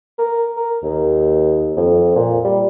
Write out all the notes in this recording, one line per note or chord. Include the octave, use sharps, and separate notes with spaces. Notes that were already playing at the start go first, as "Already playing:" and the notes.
A#4
A#4
D#2
F2
A#2
G3